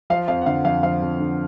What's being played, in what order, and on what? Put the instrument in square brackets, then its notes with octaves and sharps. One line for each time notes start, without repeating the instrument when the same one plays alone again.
[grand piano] F3 F5
F2 F5
F#5
D3 F5
F2 F5
F3 F5
F2
D3